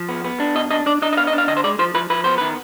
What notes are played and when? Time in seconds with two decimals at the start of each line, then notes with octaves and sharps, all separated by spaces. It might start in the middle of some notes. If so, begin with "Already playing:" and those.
Already playing: F3
0.09 B3
0.24 B3
0.40 D4
0.55 B2 D#5
0.71 D4 D#5
0.86 D4 D5
1.02 D4 D#5
1.13 D#5
1.17 B3 F5
1.27 D#5
1.33 D4
1.38 F5
1.48 D3 D#5
1.57 C5
1.64 G#3 D5
1.79 F3 C5
1.94 F3 B4
2.10 F3 B4
2.24 B3 C5
2.38 D#3 B4